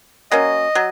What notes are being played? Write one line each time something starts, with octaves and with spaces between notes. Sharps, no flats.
F#3 A#3 C#4 D#5
F#3